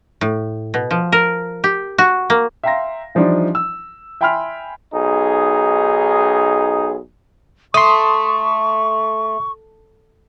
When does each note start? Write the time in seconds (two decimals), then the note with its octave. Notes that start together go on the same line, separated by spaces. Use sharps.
0.21 A2
0.74 B2
0.91 F3
1.12 A#4
1.64 G4
1.98 F#4
2.30 A#3
2.64 E5 F5 G5 A#5 C6 A#6
3.15 E3 F3 G3 D4 D#4
3.55 E6
4.21 E5 G5 G#5 B5 C6 F6
4.93 B1 D#4 G#4
7.74 A3 C6 C#6 D#6